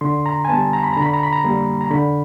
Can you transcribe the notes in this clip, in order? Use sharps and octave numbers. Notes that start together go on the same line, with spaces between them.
D3 C6
A#5
G#5
G3 B3 A5
A#5
B5
D3 A#5
B5
A#5
B5
A#5
G3 A#3
A#5
D3 B5